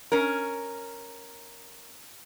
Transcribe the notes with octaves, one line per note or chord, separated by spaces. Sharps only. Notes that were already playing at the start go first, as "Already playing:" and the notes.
C#4 A#4